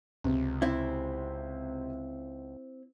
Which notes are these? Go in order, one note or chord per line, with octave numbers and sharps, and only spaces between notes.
C#2 C3
C4 E4